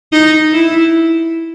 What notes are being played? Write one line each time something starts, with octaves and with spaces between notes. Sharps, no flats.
D#4
E4